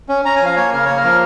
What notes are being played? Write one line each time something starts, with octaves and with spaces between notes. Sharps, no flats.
C#4
C#4 A#5
G#5
F3 F5
A#3 C#5
C#3 A#4
A#3 C#5
A#4
F3